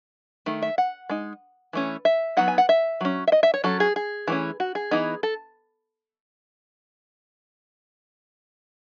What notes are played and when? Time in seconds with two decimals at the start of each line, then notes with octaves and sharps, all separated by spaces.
0.46 D#3 A3
0.62 E5
0.78 F#5
1.10 G#3 D#4
1.73 E3 A3 C#4
2.05 E5
2.37 F#3 B3 D#4 F#5
2.48 G#5
2.58 F#5
2.69 E5
3.01 F#3 C#4
3.27 E5
3.32 D#5
3.43 E5
3.54 C#5
3.64 F#3 C#4 A4
3.80 G#4
3.96 G#4
4.28 E3 A3 C#4
4.60 F#4
4.75 G#4
4.91 E3 B3 D#4
5.23 A4